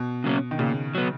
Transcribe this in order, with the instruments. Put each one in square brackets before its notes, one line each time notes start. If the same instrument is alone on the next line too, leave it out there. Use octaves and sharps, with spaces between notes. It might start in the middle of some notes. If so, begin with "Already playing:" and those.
Already playing: [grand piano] B2
[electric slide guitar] C#3 F#3 A#3 C#4
[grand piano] D#3
[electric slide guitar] A#2 [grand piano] C#3
[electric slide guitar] F#3 B3